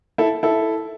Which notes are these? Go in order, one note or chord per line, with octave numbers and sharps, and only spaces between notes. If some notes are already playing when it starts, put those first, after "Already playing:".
E4 A4
E4 A4